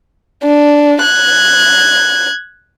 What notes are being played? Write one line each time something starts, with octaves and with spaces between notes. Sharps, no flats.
D4
F#6 G#6